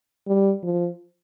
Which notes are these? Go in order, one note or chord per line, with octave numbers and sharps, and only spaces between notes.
G3
F3